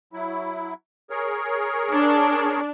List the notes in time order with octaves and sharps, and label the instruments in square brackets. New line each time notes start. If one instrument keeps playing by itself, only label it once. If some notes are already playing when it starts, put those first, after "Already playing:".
[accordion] F#3 E4
G#4 A#4 C#5
[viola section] D4